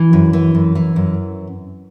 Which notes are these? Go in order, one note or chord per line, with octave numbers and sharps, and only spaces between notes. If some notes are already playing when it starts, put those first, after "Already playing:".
Already playing: E3
F#2
E3
F#2
E3
F#2